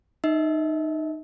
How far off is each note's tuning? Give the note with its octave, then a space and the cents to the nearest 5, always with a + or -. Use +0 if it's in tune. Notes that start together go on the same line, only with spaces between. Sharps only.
D#4 -15 E5 -40